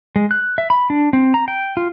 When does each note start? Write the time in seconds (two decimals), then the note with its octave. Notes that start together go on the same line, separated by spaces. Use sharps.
0.16 G#3
0.31 F#6
0.58 E5
0.70 B5
0.90 D4
1.13 C4
1.34 A#5
1.48 G5
1.77 F4